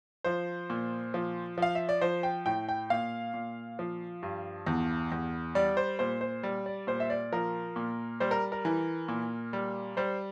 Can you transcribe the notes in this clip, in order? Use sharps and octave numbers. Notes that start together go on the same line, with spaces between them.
F3 C5
A#2
F3
F3 F5
E5
D5
F3 C5
G5
A2 G5
G5
A#2 F5
A#2
F3
G2
E2
E2
G3 D5
C5
A#2 C5
C5
G3
D5
A#2 C5
E5
D5
F3 A#4
A#2
G3 C5
A#4
A#4
E3
A#2
G3
G3 C5